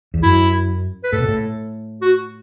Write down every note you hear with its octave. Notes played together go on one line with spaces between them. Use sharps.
E2
F#2 E4
B4
A2 A4
B2
A2
F#4